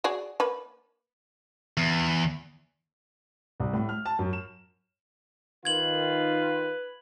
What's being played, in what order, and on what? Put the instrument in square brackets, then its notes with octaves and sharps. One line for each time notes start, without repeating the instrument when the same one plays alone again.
[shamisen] F#4 G#4 D5
A#3 B4
[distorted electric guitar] E2
[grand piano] C2
A2
F6
A5
F#2
E7
[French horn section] D#3 [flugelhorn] F4 [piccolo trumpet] B4 [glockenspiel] G#6 F#7